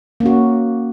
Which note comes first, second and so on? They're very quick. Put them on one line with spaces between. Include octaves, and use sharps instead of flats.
A#3 C#4 F#4